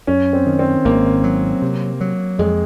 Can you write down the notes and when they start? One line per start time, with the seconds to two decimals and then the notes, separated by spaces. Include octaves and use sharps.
0.07 F#2 C#4
0.33 C4
0.46 D#3
0.59 C4
0.85 G#1 A#3
1.24 F#3
1.62 C3
2.01 F#3
2.39 F2 G#3